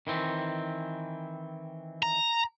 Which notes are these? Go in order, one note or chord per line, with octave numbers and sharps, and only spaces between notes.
D#3 E3 C4
A#5